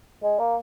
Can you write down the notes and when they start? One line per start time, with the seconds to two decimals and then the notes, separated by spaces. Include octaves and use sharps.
0.23 G#3
0.39 A#3